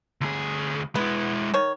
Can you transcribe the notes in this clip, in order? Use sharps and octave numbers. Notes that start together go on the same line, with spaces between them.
D2 G#4
G#3 B3 E4
D#3 C#5